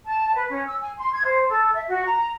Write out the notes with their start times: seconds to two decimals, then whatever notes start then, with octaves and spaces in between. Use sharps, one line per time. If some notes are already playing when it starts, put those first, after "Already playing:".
0.04 A5
0.33 B4
0.50 C#4
0.66 E6
0.80 G#5
0.97 C6
1.13 G#6
1.24 C5
1.47 A4
1.73 E5
1.87 F#4
2.05 A#5